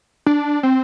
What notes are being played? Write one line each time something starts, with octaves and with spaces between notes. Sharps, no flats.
D4
C4